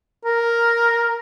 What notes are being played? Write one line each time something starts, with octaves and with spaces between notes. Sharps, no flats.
A#4